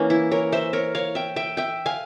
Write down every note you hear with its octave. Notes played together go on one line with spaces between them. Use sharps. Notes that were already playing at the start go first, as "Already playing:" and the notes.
Already playing: E3 A#3 C#4
E4
A#4 C#5
C5 E5
A#4 C#5
C#5 F5
E5 G5
E5 G5
E5 G5
F5 G#5